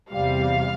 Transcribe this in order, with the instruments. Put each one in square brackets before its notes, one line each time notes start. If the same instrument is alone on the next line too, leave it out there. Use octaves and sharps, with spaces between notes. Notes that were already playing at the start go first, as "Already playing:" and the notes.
[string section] E2 C3 G3 F5